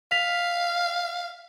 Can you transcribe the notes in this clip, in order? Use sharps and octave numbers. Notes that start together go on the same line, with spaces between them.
F5 B6 F7